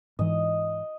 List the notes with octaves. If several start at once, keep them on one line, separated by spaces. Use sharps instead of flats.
G#2 E3 D#5